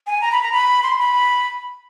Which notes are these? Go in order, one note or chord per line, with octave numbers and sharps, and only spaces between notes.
G#5
A#5
B5
A#5
B5
C6
B5